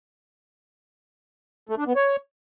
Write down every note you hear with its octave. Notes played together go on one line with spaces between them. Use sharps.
A3
D4
B3
C#5